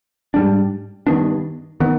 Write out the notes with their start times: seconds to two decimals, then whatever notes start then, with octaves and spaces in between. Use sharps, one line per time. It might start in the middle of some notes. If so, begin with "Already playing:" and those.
0.34 G#2 G3 D4
1.07 G2 D#3 B3 D4
1.80 D#3 B3